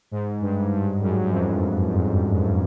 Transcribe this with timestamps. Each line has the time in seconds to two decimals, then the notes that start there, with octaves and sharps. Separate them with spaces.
0.11 G#2
0.41 G2
0.71 G2
1.01 F#2
1.21 F#2
1.31 F2